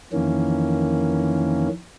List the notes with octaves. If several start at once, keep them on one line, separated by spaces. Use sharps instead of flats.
F2 D#3 E3 A#3 C#4